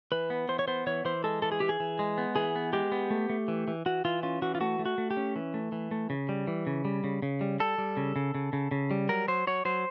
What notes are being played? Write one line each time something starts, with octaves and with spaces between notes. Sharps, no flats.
E3 B4
B3
E3 C5
C#5
B3 C5
E3 C#5
E3 C5
G#3 A4
E3 A4
G#4
E3 G4
G#4
E3
G#3
B3
E3 G#4
B3
G#3 G4
B3
A3
A3
E3
E3
E3 F#4
E3 F4
C#4 F4
E3 F#4
F4
A3 F#4
A3
F#4
A3
G4
C#4
E3
A3
E3
A3
C#3
G3
E3
C#3
G3
C#3
C#3
G3
G3 A4
G3
C#3
C#3
C#3
C#3
C#3
G3
F#3 A#4
F#3 C5
F#3 C#5
F#3 C5